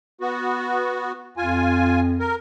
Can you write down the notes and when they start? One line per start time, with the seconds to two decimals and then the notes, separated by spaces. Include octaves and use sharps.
0.21 B3 F#4
1.37 F2 F4 G#5
2.20 A#4